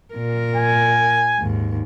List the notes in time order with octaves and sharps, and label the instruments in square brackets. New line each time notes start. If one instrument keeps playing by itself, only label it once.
[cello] A#2 A#4
[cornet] G#5
[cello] D#2 G#2